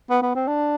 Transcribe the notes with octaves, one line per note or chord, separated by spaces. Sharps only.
B3
B3
C4
D4